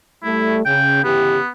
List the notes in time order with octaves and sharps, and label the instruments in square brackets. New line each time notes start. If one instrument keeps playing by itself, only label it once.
[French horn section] G3 A3 [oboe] E4
[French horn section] C#3 [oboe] G5
[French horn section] C#3 E3 G4 [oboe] B3